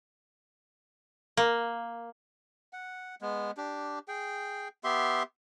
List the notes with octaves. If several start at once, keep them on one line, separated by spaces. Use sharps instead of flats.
A#3
F#5
G#3 B3
D4 G4
G#4 G5
B3 G4 E5 C6